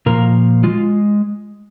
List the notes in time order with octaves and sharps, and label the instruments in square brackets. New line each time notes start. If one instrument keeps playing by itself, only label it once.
[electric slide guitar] A#2 F3 A#3 A#4
D#3 G#3 F4